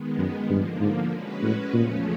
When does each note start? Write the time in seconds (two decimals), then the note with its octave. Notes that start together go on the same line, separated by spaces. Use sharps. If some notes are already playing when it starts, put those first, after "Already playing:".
Already playing: D#3 G#3 B3
0.18 F#2
0.49 G2 D3 F3 A#3
0.80 G#2
1.11 G#3 C#4 F#4 B4
1.42 A2
1.73 E2 A#2 C#3 F3 A3 C#4